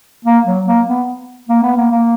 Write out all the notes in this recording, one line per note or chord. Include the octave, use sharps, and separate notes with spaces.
A#3
F#3
A#3
B3
A#3
B3
A#3
A#3